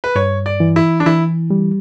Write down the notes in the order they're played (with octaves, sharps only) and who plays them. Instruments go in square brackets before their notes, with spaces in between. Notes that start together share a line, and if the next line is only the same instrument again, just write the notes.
[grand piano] B4
[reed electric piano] G2 [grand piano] C#5
[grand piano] D5
[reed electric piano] E3
[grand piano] E4
D4
[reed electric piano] E3 [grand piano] E4
[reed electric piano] G3